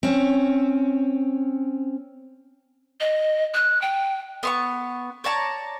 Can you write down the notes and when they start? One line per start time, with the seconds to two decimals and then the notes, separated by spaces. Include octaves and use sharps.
0.03 C4 C#4
3.00 D#5
3.54 F#6
3.82 G5
4.43 B3 C6 C#6
5.24 C#5 D5 A5 A#5